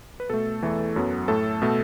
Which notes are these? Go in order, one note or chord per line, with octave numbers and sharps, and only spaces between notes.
B4
B2 A3 A4
E2 E3 A3
F#2 F#3 B3
A2 A3 A4
B2 A3